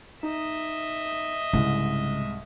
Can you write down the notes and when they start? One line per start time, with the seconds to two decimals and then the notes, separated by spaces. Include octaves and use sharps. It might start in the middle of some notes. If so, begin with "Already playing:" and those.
0.23 D#4 D#5 E5
1.53 C2 G#2 C#3